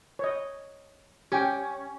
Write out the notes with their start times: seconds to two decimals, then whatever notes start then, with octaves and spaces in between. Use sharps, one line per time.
0.19 C#5 D#5
1.32 C#4 G4 G5